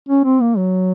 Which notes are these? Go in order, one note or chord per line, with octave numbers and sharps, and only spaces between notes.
C#4
C4
A#3
F#3